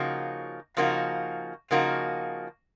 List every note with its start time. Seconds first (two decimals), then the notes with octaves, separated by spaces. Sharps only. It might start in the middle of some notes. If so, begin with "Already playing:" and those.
Already playing: C#3 F3 A#3 D#4 F#4
0.77 C#3 F3 A#3 D#4 F#4
1.71 C#3 F3 A#3 D#4 F#4